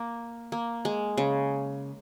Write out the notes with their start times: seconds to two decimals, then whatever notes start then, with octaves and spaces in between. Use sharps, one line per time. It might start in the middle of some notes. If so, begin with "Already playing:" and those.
Already playing: A#3
0.52 A#3
0.85 G#3
1.17 C#3